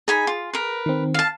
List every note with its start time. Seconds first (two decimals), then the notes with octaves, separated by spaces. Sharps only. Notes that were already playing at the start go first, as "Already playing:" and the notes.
0.08 D#4 G#4 G#5 B5
0.27 F4
0.53 A#4 B4
0.86 D#3 C4
1.14 F5 A5